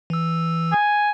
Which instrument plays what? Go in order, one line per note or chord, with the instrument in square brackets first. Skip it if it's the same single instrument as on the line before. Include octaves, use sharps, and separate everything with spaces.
[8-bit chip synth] E3 E6
[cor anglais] G#5